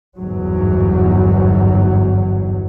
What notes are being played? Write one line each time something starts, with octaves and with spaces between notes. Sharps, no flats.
G1 E2 G#2 F#3